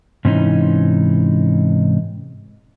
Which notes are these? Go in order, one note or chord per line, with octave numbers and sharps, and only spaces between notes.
G#2 C3 E3 C#4 D#4